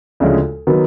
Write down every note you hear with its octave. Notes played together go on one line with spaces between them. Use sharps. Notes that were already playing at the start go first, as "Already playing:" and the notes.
D2 C#3 F3 G#3 C#4
D#3 F#3 B3